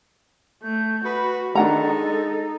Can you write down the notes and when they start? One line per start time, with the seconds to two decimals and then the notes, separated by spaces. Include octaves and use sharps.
0.63 A3 G6
1.05 F#4 B4 B5
1.55 D#3 G#3 D4 A4 F#5 A#5
1.85 D#4